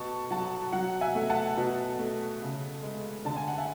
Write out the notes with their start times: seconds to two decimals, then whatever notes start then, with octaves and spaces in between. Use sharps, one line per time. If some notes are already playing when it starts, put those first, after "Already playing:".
Already playing: B2 A3 A5 C#6
0.31 F#3 F#5 A5
0.73 F#3 F#5
1.01 E5 G#5
1.15 A3
1.30 F#5 A5
1.57 B2
1.99 A3
2.42 C#3
2.83 G#3
3.25 D3 A5
3.36 G#5
3.48 F#5
3.58 E5 G#5